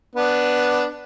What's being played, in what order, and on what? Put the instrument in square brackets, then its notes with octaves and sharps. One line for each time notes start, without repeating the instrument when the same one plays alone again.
[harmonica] B3 D4